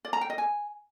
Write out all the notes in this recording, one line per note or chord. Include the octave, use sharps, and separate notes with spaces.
D5
A#5
G5
D#5
G#5